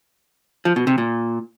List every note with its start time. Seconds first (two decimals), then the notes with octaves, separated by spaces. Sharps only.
0.65 F3
0.76 B2
0.87 C3
0.98 A#2